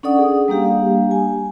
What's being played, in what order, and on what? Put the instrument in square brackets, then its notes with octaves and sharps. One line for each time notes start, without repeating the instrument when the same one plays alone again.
[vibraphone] C#4 D4 A4 D5 F#5 D#6
G#4
G3 A#3 D4 G4 F5
G#5